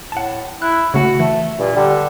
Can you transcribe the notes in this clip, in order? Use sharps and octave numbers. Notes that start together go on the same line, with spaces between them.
A2 F#5 A5
E4 F#6
C#3 A3 F#4
E3 A3
G2 A#2
D3 G3